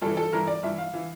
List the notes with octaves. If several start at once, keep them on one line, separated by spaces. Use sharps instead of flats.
G2 E3 A4
A4
G2 E3 A#4
D5
G2 E3 E5
F5
E3